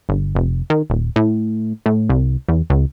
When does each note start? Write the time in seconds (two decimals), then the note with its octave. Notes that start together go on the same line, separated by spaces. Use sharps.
0.09 G1
0.35 F1
0.70 D#3
0.90 D#1
1.16 A2
1.86 A2
2.09 C2
2.49 E2
2.70 C#2